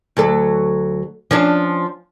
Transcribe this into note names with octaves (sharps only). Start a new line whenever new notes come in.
D2 F#3 A4
F3 C#4 D4